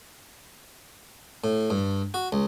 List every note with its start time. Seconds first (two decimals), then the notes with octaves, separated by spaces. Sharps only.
1.44 A2
1.70 G2
2.14 F#4
2.32 C#2